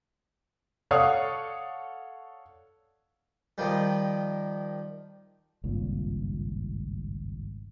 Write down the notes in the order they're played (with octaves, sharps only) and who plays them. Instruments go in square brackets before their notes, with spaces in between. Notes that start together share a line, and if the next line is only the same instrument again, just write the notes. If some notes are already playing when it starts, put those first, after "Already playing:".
[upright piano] A4 C#5 D5 F5 F#5 D#6
[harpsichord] D#3 F3 G3
[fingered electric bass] G#1 C#2 G2 A#2